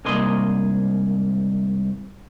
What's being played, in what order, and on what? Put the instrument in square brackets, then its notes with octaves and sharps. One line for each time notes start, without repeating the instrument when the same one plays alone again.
[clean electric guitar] C2 G#2 A#3 G#4 D#5 C6